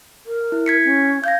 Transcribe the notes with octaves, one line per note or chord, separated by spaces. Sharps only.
A#4
E4
G#6 B6 C#7
C#4
F5 G6 G#6 A#6